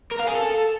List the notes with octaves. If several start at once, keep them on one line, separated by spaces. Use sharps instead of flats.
A#4
F5
G#4
A4